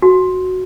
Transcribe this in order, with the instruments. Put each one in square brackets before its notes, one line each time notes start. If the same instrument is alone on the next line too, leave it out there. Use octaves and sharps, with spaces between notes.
[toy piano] F#4